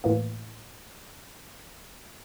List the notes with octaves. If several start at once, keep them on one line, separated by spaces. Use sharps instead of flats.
A2 E3 A#3